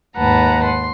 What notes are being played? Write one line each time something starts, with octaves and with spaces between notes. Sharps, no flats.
D#2 G#2 B4 F#5 A5 A#5
C6